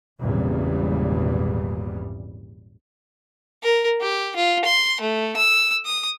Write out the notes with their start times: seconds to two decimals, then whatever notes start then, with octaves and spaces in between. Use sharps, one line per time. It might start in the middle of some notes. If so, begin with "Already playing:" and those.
0.20 G#1 E2 A#2 C#3 G3
3.63 A#4
4.01 G4
4.36 F4
4.65 C6
5.01 A3
5.37 E6
5.86 D#6